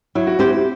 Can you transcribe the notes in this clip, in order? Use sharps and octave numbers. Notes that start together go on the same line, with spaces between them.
F#3 E4
F#4
C4 E4 G4 C5